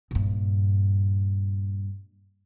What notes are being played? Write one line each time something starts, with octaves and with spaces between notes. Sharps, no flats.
G2 A#2